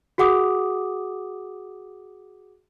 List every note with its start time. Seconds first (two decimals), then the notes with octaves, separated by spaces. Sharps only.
0.18 F#4 G#4 F#5 D6 D#6